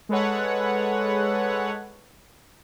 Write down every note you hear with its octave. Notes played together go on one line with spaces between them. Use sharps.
G#3 A4 B4 C#5 F#5